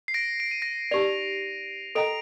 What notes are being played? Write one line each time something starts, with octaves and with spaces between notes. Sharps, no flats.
C7
A#6 D7
D7
D#7
A#6 D7
D#4 G4 D5 D7 F7
A4 D#5 G5 A#5 D7 F7